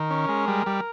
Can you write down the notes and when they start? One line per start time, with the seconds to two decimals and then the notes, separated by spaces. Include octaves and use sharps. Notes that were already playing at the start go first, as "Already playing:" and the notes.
Already playing: D#3 A#4
0.10 C#4
0.29 G#3
0.48 G3
0.66 G3